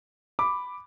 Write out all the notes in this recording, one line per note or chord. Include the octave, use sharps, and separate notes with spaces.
B5 D6